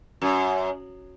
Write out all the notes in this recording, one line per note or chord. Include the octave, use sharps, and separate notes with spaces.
F#2